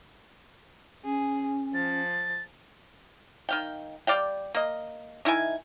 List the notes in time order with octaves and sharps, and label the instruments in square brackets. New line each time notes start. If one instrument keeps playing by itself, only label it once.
[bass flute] C#4 [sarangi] G#4
[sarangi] F3 [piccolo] A6
[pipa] D#3 F5 G5
G3 D5 F5 G5
A#3 D#5
D#3 E4 F4 G#5